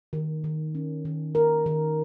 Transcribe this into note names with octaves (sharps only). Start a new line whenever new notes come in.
D#3
D#3
C#4
D#3
A#4
D#3